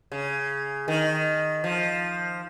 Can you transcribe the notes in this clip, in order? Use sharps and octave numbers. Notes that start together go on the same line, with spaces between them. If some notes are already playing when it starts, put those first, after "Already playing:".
C#3
D#3
F3